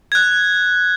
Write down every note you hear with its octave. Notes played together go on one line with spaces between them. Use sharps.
F#6 G#6